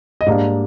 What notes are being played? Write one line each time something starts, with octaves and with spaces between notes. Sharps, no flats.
D#5
G#2 G3 A#3 D4 D5